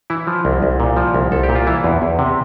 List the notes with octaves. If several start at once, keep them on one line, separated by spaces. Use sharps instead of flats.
E3 E4
F3
C2
C2
A#2
F3
C2
C2 A4
G4
A#2
F4
E3 E4
E2
E2
C3